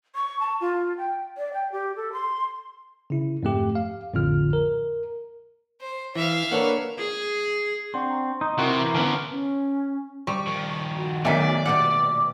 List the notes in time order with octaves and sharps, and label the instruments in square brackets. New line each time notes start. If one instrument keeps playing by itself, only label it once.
[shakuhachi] C#6
A5
F4
G5
D5
G5
G4
A4
C6
[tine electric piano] C#3 E4
F2 G#2 A3 G4
F5
A#1 F2 A2 D3 F4 F6
A#4
[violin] C5
[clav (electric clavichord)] E3 [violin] E5 F5
[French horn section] A#3 D4 B4 [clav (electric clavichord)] A4 C#5 F#5
[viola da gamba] G#4
[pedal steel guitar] C4 [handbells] D4 D5 F#5 [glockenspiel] C6 C#6
[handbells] A#5
[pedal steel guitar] D#4
[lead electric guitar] C3 [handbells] E4 A#4 [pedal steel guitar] F#4 [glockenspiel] D7
[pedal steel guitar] E3 [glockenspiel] A#5 D6
[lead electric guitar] D3 B3 [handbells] C#4 F6 [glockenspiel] A5 C#6 D7
[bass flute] C#4
[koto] G3 [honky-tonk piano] C#6
[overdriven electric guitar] D#3 F3
[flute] F#4
[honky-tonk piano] B1 G#5 B6 [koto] D#3 A3 [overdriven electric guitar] D5
[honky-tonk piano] A#1 [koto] B2 G3 F#5 [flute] D6